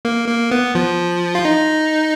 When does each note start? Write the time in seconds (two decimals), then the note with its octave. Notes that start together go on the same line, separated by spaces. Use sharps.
0.05 A#3
0.28 A#3
0.52 B3
0.75 F3
1.35 F4
1.45 D#4